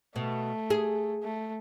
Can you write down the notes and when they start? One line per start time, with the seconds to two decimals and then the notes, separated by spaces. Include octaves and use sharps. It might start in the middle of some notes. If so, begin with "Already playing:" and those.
0.16 B2 A3
0.70 G#4
1.23 A3